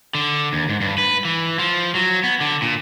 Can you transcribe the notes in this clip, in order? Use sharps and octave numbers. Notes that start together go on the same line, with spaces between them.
D3
D#2
G#2
G2
B4
E3
F3
F#3
B3
D3
A#2